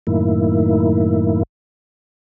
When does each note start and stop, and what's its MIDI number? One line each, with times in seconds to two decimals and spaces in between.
0.07 1.43 42
0.07 1.43 45
0.07 1.43 51
0.07 1.43 58
0.07 1.43 64